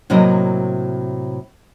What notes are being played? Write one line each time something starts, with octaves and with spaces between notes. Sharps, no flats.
A2 C3 F#3 A#3 A#4 D#5